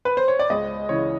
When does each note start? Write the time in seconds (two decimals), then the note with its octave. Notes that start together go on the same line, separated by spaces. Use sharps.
0.05 B4
0.17 C5
0.28 C#5
0.39 D5
0.50 C#2 D#5
0.89 C#3 E3 C#5